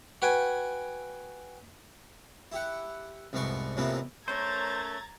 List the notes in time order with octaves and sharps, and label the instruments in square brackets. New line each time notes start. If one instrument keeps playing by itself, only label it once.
[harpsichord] F#4 B4 G5 G#5
E4 G4 F#5
C2 F2 G#2 B3 D5 C#6
F2 A2 C3 E3 A#3 B3
[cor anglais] A3 [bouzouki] C#4 A#4 C#5 [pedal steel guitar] C5 [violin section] A#5 G#6 A6